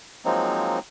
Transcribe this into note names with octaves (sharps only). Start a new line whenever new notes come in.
F3 F#3 G#3 A#3 C4 D#4